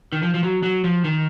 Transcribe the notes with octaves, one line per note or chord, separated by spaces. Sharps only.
D#3
F3
F3
F#3
F#3
F3
D#3